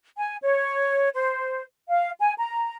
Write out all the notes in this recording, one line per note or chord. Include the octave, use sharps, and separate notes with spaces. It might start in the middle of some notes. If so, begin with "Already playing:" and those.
G#5
C#5
C5
F5
G#5
A#5